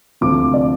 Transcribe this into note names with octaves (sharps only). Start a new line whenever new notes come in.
D2 C3 F3 D6
D5